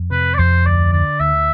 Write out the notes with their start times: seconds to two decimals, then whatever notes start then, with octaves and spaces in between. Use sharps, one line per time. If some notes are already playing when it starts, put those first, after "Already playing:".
Already playing: F2
0.11 C3 B4
0.34 D5
0.38 F2 C5
0.66 D2 D5
0.93 D3 D5
1.20 D2 E5